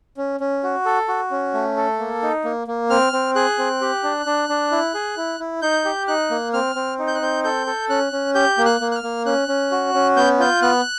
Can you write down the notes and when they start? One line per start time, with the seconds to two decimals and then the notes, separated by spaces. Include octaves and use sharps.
0.17 C#4
0.40 C#4
0.63 F#4
0.86 A4
1.08 F#4
1.31 C#4
1.54 A3
1.77 A4
1.99 A#3
2.22 D#4
2.44 A#3
2.67 A#3
2.90 C4 F6
3.13 C4
3.35 G#4 F#6
3.58 C4
3.81 G4
4.04 D4
4.26 D4
4.49 D4
4.72 E4
4.94 G#4
5.17 E4
5.40 E4
5.62 D#4 G6
5.85 G4
6.08 D#4 F#6
6.31 A#3
6.53 C4 F6
6.75 C4
6.99 D#4
7.07 G6
7.15 F#6
7.22 C4 G6
7.44 A4 G6
7.67 A4
7.89 C#4 F#6
8.12 C#4
8.35 G4 G6
8.58 A#3
8.65 F#6
8.80 A#3
8.91 F#6
8.95 F6
9.03 A#3
9.26 C#4 F#6
9.48 C#4
9.71 F#4
9.94 C#4
10.16 B3 G6
10.39 F4 G6
10.62 B3 F#6